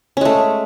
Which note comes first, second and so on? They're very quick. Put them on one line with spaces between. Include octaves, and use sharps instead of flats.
C#4 G#3 A3